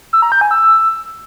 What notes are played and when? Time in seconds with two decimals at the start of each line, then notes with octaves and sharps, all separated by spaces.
0.13 E6
0.22 A#5
0.32 G6
0.41 G#5
0.51 E6